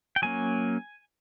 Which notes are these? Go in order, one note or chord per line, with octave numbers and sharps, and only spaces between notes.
G5
F#3 A#3 C#4 G#5